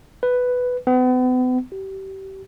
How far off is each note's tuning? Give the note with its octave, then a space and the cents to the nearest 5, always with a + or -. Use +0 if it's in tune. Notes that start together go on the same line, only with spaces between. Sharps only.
B4 +5
B3 +40
G4 -30